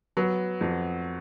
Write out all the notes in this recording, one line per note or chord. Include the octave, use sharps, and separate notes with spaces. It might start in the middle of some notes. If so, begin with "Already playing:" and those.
F#3 B3
F2